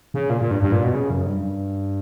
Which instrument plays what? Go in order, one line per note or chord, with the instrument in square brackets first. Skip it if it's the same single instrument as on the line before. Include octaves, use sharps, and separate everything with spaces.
[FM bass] C#3
A#2
A#2
G2
G2
A#2
B2
C#3
F#2
G2